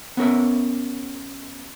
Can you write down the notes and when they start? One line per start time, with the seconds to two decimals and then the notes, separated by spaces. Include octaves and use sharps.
0.17 B3 C#4 A#4 E5